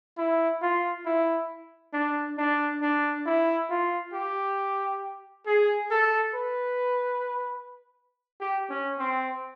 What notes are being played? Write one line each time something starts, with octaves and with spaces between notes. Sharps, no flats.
E4
F4
E4
D4
D4
D4
E4
F4
G4
G#4
A4
B4
G4
C#4
C4